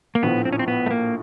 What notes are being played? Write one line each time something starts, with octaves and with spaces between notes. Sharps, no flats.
A#3
A#1 A2 F3 B3
C4
C#4
C4
B3
A3
A#3